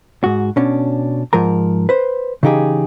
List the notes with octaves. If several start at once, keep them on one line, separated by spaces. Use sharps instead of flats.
G#2 F#4
B2 C#4 D4
G#2 F3 A#4 A#5
B4 C5
C#3 E3 D#4 G4 G#4